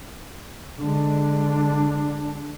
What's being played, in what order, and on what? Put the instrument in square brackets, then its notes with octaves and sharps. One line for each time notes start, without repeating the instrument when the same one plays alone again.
[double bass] D3 G#3 [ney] D4